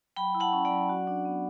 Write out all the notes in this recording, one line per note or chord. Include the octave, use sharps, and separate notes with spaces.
F#3 G5 B5
E4
F#5 A5
C#4
D5 F#5
F#3
F#4
D4
B3